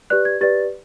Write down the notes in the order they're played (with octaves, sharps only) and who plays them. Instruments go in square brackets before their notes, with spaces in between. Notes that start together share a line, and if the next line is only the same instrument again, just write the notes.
[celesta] G4 B4 D5 F#6
G#6
G4 B4 D5 A6